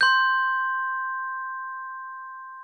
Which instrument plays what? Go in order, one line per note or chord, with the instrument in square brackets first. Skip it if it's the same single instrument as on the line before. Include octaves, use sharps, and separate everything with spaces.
[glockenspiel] C6 G6